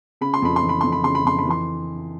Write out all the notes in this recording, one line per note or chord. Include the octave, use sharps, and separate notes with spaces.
C#3 B5
C6
F2 B5
C6
E3
B5
F2 C6
B5
C#3 C6
B5
F2 C6
B5
E3
C6